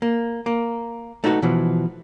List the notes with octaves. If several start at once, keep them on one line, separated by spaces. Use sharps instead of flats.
A#3
A#3
A3 D#4 E4 F#4 B4
B2 E3 F3